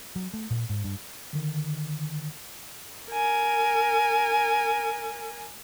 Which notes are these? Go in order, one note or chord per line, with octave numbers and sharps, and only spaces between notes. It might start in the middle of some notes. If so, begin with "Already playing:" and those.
F#3
A3
A#2
G#2
G2
D3 D#3
A#4 G#5